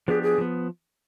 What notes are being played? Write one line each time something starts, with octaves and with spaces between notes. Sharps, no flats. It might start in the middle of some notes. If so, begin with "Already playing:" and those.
F3 B3 D4 G4 G#4
G#4
F3 B3